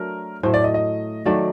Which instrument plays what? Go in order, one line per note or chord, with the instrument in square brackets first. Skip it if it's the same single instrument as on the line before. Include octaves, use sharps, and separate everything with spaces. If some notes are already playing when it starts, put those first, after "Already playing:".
Already playing: [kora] F#3 A3 D4 [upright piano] A#4
[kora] A2 F#3 A3 [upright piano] C5
[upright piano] D5
D#5
D#5
[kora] D#3 F#3 A3 [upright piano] D5